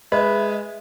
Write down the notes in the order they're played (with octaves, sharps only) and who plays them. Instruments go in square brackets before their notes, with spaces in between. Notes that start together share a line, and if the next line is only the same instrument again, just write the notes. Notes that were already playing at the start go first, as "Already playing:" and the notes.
[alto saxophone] G#3 [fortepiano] B4 [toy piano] D#5 [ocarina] E5